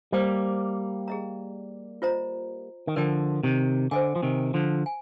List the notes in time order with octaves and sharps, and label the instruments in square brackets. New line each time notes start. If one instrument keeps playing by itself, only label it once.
[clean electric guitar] G3 A#3 [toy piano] C5 D#5 G5
[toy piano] G#4 D#5 A#5
F4 C5 D#5 A#5
[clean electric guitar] D#3
[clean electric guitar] D3 F3 [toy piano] A#4 D5 G5
[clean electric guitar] C3 D#3
[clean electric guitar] D3 [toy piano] C5 D#5 G#5
[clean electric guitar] F3
C3 D#3
D3 F3
[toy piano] G#5